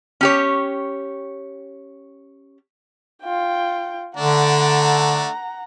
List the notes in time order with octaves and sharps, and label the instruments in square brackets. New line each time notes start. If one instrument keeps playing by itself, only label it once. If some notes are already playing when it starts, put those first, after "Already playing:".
[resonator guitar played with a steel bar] C#4 G4 C#5
[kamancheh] F4 G5
[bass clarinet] D3 [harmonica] A3 D4 [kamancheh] F#5 A#5